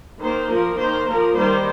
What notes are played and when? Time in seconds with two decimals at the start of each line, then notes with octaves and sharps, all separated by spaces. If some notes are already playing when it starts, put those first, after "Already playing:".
0.20 D#3 A#3 C5
0.49 F3 A#3 A#4
0.78 D#3 A#3 C5
1.07 F3 A#3 A#4
1.35 D#3 G3 A#3 C5